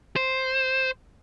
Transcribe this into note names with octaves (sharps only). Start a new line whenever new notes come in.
C5